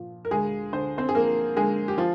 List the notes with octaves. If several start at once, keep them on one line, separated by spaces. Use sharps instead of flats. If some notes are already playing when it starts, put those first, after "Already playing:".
Already playing: A#2 F3
A#4
D2 G#3 G#4
D3 C5
C4 C5
G#4
F3 A#3 A#4
D3 G#3 G#4
G4
F3 F4